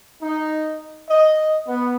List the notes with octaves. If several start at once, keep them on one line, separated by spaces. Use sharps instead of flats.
D#4
D#5
B3